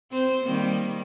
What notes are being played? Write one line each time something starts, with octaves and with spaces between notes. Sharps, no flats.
C4 C5
D#3 G3 A#3